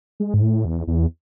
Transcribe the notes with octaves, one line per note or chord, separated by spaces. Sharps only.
G#3
G#2
A2
E2
E2